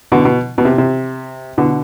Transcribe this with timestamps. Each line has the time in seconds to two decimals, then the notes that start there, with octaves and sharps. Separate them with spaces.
0.12 B2 D3
0.25 B2
0.58 B2
0.65 C3
0.78 C3
1.58 B2 D3